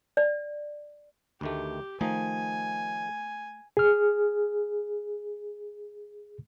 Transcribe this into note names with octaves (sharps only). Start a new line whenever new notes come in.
D5
D2 D#3 A3 G4
D#3 F3 A3 D#4 G#5
G#4 F6